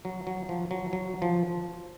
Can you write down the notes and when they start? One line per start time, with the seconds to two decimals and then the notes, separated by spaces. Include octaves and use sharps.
0.05 F#3
0.27 F#3
0.49 F3
0.71 F#3
0.93 F#3
1.22 F3